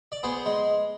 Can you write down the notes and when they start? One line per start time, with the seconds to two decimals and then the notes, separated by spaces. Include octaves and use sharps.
0.12 D5
0.23 B3 G#4 C5
0.46 G#3